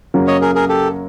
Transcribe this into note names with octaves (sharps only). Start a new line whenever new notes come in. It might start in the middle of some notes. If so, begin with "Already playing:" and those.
F#2 C#3 F#3 A#3
C#5 D#5
G#4 A#4
G#4 A#4
G4 A4